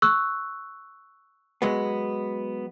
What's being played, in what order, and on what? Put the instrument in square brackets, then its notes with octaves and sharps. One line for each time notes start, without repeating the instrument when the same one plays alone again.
[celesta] C#6 E6 F#6
[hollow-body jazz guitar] F#3 G#3 B3